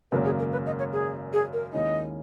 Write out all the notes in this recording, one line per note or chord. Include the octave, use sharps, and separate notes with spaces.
G#1 F#2 C#3 F#3 A#3 B4
G#4
A#4
B4
D#5
C#5
G#4
G#4
A#4
D#2 D#3 G#3 C#4 E4 D#5